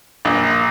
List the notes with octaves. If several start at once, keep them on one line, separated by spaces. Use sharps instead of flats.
A#1